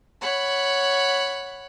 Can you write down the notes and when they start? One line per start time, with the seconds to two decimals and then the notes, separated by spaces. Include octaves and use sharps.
0.21 C#5 F#5 B5